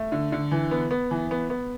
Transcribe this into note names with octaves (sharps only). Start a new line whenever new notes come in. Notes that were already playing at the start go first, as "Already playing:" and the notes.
Already playing: A3
D3
D3
E3
B3
B3
E3
B3
B3